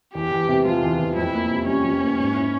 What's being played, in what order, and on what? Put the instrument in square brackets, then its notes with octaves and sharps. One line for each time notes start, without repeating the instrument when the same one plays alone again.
[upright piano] E2 [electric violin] G4
[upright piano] E2
C3
[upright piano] F3 [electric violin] F4
[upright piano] E2
E2
[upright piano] F2 [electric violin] E4
[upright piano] A#3
C3
[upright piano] G3 [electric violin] C#4
[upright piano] F2
A#3
G#2
E4